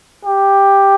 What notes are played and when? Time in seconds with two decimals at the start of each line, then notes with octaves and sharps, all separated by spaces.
0.25 G4